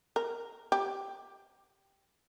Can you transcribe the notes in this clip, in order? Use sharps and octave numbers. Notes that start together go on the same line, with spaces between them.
A#4
G4